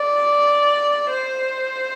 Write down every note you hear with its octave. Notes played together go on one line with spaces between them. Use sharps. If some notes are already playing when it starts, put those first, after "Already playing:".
Already playing: D5
C5